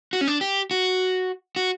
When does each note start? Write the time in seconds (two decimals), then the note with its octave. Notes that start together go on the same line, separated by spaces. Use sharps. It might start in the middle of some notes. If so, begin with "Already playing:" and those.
0.13 F#4
0.21 C#4
0.28 D4
0.41 G4
0.71 F#4
1.56 F#4